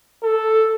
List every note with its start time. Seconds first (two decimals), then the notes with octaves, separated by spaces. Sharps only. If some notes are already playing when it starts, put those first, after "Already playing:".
0.23 A4